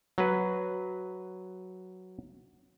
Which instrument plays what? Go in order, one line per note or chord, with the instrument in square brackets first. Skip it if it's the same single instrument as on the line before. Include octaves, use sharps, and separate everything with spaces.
[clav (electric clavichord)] F#3 B4